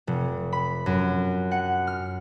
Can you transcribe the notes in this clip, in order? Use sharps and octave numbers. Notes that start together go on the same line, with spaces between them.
F1
B5
F#2
F#5
F6